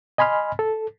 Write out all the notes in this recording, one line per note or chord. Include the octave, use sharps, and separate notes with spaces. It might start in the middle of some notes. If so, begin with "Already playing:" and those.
D#5 G#5 B5 C6 F6
A4